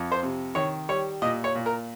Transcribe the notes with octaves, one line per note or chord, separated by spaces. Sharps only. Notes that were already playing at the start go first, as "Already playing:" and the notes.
Already playing: F2
C5
C3
D#3 C#5
G3 C#5
A#2 D#5
C#5
A#2
A#4